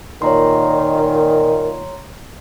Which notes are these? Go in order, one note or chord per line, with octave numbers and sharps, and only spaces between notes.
A#2 D#3 C#5 A#5 C6